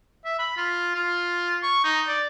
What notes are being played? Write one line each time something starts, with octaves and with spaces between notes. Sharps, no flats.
E5
B5
F4
F4
C#6
D#4
D5